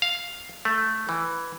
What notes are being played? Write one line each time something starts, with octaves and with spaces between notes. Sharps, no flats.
F5
A3
E3